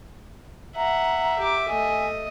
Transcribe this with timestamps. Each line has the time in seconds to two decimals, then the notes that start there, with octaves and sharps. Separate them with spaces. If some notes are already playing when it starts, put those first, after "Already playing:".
0.77 E5 F#5 A#5
1.39 G4 D6
1.69 A3 D#5 G#5